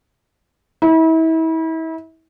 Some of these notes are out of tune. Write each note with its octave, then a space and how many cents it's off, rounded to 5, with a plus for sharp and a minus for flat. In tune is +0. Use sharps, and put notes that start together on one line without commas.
E4 -35